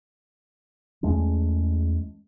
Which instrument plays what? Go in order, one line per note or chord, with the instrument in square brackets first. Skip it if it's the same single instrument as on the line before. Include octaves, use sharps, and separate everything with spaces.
[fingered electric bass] E2 G#3 A3 C#4